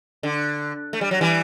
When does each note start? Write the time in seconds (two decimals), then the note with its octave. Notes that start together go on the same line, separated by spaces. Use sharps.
0.23 D3
0.93 A3
1.01 G3
1.11 F#3
1.21 E3 G3